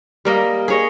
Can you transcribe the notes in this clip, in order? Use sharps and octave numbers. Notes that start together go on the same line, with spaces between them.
G3 A#3 D#5
G#4 C#5 D#5